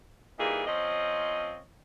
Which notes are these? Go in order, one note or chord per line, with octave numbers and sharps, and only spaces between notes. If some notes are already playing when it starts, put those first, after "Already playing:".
A#2 E3 G3 D#4 G#4
F3 C4 C#4 D#5